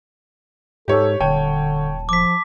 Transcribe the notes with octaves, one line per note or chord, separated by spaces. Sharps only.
G#2 G4 A4 C#5
D#1 D3 C#5 G5 A5
F3 D6 B6